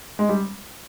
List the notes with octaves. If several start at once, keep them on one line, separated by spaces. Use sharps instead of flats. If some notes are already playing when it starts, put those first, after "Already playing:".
G#3
G3